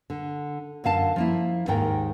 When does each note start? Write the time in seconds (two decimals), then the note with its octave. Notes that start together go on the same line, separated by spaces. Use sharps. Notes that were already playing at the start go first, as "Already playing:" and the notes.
0.10 D3
0.84 F#2 D3 F5 A5
1.16 F3 A#3 E4
1.67 D#2 G#2 D#3 A#4 G5